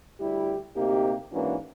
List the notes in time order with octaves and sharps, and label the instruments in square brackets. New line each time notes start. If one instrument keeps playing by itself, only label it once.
[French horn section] D2 G3 E4 G4
D2 C3 A#3 D#4 G4
G#2 E3 A#3 C#4 D4 F#4